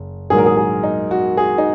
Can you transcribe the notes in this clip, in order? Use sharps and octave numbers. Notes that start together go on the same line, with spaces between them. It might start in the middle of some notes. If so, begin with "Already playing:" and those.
Already playing: F#1
A#1 G#2 D#3 F#3 A#3 G#4
A#4
G#4
G#4
D#4
F#4
G#4
D#4